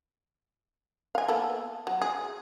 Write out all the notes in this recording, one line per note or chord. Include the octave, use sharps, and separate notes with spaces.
F5 G#5
A#3 B3 A4
F#3
G#4